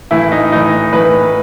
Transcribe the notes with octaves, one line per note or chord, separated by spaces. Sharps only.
A2 E3 E4
D#4
A2 E3 D#4
A2 E3 B4